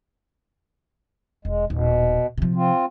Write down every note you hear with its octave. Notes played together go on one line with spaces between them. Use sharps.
E1 G#3
D#1 B2
C3 F3
C4 F4